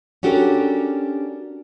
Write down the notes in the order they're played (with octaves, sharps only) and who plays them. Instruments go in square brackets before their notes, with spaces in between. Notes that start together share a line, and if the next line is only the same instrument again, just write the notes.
[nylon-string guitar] C#4 D4 F#4 G4 A4 A#4